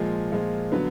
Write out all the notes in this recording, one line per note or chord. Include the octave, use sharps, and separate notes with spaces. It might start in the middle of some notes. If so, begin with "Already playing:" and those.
Already playing: A#2 F3 G#3
A#2 F3 G#3
D3 F#3 B3